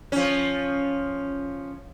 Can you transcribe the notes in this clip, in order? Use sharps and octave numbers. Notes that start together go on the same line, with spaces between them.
F3 C#4